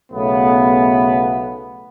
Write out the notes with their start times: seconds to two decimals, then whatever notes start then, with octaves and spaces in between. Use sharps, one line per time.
0.12 B1 C#3 A3 B3